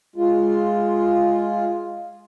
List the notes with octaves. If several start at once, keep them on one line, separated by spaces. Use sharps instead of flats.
G#3 F4